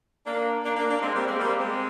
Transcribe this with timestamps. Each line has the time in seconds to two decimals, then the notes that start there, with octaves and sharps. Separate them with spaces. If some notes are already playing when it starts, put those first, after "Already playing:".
0.25 A#3 D4
0.63 A#3 D4
0.76 A#3 D4
0.89 A#3 D4
1.01 G#3 C4
1.14 G3 A#3
1.26 G#3 C4
1.39 G3 A#3
1.58 G#3 C4